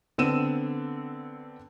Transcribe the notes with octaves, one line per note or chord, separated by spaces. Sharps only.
D3 B3 C4 E6 D#7 E7